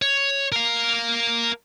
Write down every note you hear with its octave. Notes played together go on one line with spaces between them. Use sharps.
C#5
A#4 F5